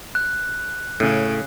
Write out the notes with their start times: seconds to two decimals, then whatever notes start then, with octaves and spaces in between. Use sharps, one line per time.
0.15 F#6
1.00 A2 C#3